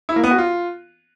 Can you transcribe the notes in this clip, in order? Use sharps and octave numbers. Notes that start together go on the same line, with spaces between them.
E4
A#3
B3
F#4
F4